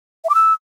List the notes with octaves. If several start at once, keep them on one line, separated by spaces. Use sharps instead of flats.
E5
D6
E6